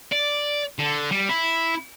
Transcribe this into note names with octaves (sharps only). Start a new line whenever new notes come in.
D5
D3
G3
E4